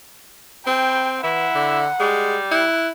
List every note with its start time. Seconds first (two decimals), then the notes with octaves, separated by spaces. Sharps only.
0.67 C4 G5
1.24 E3 E4 F#5
1.55 D3
2.00 G3 G#3
2.51 E4 F#6